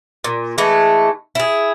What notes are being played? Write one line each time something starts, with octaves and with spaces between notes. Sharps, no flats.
A#2
E3 G#3 A3
E4 G#4